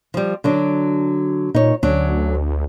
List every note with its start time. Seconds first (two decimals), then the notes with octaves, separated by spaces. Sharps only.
0.14 F3 G3
0.44 D3 F#3 D4
1.55 A#2 D#4 C#5
1.83 D2 F#3 C#4 D4